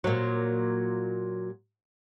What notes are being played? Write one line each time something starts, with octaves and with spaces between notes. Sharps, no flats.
A#2 F#3